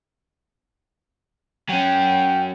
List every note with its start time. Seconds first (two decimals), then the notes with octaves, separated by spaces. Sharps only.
1.69 F#3 C#4 G5